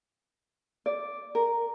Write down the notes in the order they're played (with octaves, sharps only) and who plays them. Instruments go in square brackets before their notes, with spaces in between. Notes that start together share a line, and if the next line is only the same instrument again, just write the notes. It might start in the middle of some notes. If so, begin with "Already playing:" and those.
[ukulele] D5
A#4